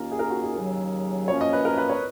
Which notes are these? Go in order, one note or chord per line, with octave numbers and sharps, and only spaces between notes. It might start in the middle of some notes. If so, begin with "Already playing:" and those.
Already playing: D#2 D#3 A#3 C#4 F4 A#4
G#4
A#4
F#4
G#4
D#2 C#3 F#3
F#2 F3 A#3 C#4 C#5
D#5
B4
A#4
B4
C#5